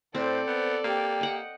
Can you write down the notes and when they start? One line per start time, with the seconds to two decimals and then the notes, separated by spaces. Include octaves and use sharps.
0.15 A2 C4 A4 C5 D5
0.47 B3
0.84 A#3 G4
1.21 D#5 F#5 G5